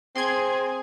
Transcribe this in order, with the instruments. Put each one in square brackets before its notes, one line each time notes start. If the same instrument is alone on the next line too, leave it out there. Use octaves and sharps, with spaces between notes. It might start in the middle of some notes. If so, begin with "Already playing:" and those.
[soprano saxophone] C4 [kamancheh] G#4 [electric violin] G#5 [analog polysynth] C6 G#6